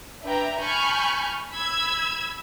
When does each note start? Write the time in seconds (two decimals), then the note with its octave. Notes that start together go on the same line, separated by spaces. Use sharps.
0.23 D4 B4 E5 G5 A#5
0.61 G#5 A5 B5 C#6 F6 G6
1.51 B5 E6 G#6